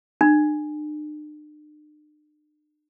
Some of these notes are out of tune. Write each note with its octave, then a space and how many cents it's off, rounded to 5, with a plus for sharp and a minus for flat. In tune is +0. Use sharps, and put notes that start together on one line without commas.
D4 +45